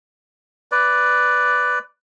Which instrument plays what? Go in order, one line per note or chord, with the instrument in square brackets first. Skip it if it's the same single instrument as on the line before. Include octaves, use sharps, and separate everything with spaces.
[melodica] B4 D5